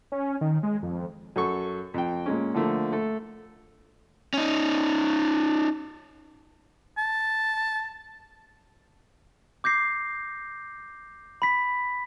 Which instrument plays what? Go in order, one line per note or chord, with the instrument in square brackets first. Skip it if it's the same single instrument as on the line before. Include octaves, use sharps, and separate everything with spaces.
[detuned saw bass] C#4
D#3
G#3
F2
[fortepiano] F#2 A4 C#6
F2 G5
A#2 G#3 C#4
D3 F3 A3 A#3
A3 A4
[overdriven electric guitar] C#4 D#4
[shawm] A5
[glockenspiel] D6 G6 A#6 C7
B5 B6